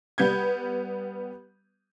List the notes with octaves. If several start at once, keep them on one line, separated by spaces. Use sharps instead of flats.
G3 B3 G6 G#6